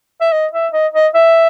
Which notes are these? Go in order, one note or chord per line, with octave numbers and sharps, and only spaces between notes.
E5
D#5
E5
D#5
D#5
E5